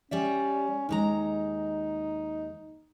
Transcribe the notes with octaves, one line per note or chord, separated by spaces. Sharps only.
G3 C#4 D5 E5
D#2 G#3 D#4 A#5